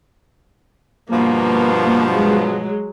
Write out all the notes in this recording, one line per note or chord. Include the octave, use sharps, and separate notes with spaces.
G2 B2 F3 A#3
F#3 G#3